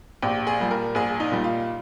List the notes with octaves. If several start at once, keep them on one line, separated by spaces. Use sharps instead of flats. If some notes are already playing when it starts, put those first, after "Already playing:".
A#1 G4
G#4
A#2 G3
A#4
A#1 G#4
D#4
A#2 G3
F4